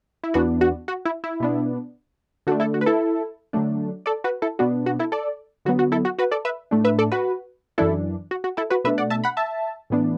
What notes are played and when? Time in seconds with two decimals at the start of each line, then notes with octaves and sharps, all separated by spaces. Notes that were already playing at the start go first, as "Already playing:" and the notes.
0.24 E4
0.34 E2 E3 B3 D4 F#4
0.61 F#4
0.88 F#4
1.05 E4
1.24 E4
1.40 B2 B3 D4
2.47 D3 A3 D4 F#4
2.60 E4 A4
2.74 F#4
2.81 B4
2.86 E4 A4
3.53 D3 F#3 A3 D4
4.06 A4 D5
4.24 F#4 B4
4.42 E4 A4
4.59 B2 B3 D4 F#4
4.86 F#4
4.99 E4 A4
5.12 A4 D5
5.65 D3 F#3 B3 F#4
5.79 F#4
5.92 E4 A4
6.05 F#4
6.19 F#4 B4
6.31 A4 D5
6.45 B4 E5
6.71 A2 A3 D4
6.85 B4 E5
6.99 A4 D5
7.12 F#4 B4
7.78 F#2 E3 D4 E4 A4
8.31 F#4
8.44 F#4
8.57 E4 A4
8.70 F#4 B4
8.84 B2 A3 D4 B4 E5
8.98 D5 F#5
9.10 E5 A5
9.24 F#5 B5
9.37 E5 A5
9.90 A2 E3 B3 D4